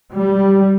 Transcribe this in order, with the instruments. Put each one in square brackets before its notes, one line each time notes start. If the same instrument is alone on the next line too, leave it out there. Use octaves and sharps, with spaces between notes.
[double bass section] G3